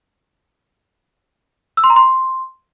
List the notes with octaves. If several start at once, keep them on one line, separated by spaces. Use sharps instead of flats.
E6
C6
A#5
C6